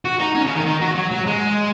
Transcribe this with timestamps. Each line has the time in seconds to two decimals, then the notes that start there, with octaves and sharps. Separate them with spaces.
0.05 F#4
0.20 D#4
0.35 C#4
0.45 C#3
0.55 D#3
0.65 D#3
0.81 F#3
0.95 F#3
1.11 F#3
1.27 G#3